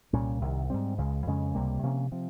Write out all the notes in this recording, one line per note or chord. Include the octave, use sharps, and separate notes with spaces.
C2 A#2 G3 C#4
C2 C3 D#3
G#2 G3 C4
C#2 C#3 G#3
F2 C#3 G#3 C#4
C#2 C3 G3 A#3
C3 F3 A#3 C#4
C3 F3 C4